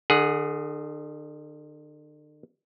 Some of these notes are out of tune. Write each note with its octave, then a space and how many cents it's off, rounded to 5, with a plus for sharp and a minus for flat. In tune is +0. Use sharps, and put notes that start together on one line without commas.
D3 +45 G#4 +0 F#5 +0